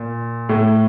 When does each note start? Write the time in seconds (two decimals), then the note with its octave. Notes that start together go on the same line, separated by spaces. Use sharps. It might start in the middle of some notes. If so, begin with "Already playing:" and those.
Already playing: A#2
0.49 A2